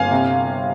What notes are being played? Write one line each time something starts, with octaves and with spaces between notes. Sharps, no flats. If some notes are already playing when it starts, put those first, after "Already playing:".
Already playing: G1 F5 G#5
C3